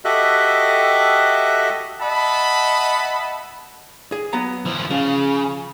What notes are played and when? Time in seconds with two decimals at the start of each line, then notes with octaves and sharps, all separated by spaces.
0.05 F#4 G4 A4 D#5 E5 F#6
2.01 D#5 E5 F#5 A5 B5
4.12 G#4
4.33 F#3 B3 A#5
4.65 F3 E4
4.91 C#3 F3